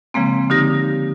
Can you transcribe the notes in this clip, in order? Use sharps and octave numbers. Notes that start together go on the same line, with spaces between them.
C#3 F3 G#3 A#3 C4
D3 D#4 G4 A#6